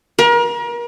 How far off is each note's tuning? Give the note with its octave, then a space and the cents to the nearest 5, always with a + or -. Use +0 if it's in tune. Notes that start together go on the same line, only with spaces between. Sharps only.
A#4 +35